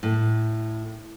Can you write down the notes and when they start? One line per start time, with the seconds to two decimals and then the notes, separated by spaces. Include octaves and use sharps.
0.03 A2